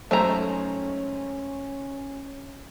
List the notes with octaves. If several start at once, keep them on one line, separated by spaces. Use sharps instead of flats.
G#1 F#2 A3 C#4 D#4 C5 A#5